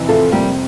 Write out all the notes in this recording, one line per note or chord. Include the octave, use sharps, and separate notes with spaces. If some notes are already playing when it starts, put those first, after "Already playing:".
Already playing: F2 C3 E3
F4 A4
G3 A#3